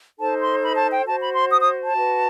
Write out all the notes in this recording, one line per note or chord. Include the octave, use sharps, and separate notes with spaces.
D#4 A4 C5 A5
C6
B5
A5
G5
F#4 C5 A5
B5
C6
D#6
D#6
A5
F#4 B4